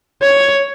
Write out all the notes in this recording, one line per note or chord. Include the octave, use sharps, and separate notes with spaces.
C#5